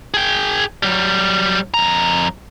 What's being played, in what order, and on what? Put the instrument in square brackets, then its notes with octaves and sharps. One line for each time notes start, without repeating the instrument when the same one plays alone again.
[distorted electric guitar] G#4 G5
F#3 G3
F2 A#5